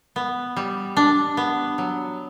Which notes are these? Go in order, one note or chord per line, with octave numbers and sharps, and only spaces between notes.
B3
G3
D4
B3
F#3